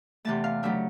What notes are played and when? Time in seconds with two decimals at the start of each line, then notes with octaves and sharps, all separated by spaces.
0.25 E2 C3 E3 A3 A5
0.44 F5
0.63 C#3 F#3 A3 D4 E5